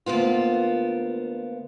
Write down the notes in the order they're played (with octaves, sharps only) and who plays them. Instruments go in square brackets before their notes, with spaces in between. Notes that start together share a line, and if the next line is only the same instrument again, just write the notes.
[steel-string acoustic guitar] D2 A#3 B3 F4